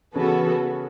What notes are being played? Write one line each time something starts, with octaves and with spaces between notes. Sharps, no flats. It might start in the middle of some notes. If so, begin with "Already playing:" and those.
C#3 E3 B3 C#4 F#4 A4